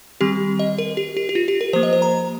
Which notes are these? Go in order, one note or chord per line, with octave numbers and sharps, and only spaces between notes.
D#3 G3 C4 G4
D#5
A#4
G4
G4
G4
F4
G4
A#4
F3 A#3 C5
D#5
C5
A#5